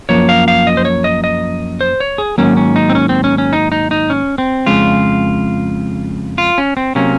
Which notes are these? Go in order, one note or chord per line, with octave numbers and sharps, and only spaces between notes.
F#2 F3 A#3 C#5
F5
F5
D#5
C5
C#5
D#5
D#5
C5
C#5
G#4
G#2 D#3 F#3 A#3 C#4
C#4
D#4
C4
C#4
C4
C#4
C#4
D#4
D#4
D#4
C#4
C4
F2 C#3 G#3 F4
F4
C#4
C4
C3 F#3 A#3 C#4